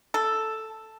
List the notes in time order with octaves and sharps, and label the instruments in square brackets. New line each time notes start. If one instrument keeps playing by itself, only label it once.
[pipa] A4